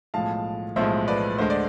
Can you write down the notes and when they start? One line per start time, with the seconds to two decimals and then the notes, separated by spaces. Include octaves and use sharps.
0.14 B1 A2 F3 G#3 F5 A5
0.76 B1 A2 F3 G#3 C5 E5
1.08 B4 D5
1.38 D2 D3 G#3 C5
1.50 D5